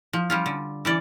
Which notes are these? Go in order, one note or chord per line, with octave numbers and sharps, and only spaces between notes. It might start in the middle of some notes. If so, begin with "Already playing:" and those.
F3
G3 C#4 F4
D3
E3 C#4 D5